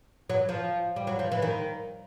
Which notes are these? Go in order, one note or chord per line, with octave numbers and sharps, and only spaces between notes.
F#3
F3
G3
F#3
F3
E3
D#3